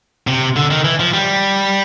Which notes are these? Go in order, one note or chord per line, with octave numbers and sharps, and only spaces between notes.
C3
D3
D#3
E3
F3
G3